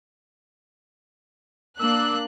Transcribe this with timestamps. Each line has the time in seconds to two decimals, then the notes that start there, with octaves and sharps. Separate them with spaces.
1.79 A#3 D4 E6 F#6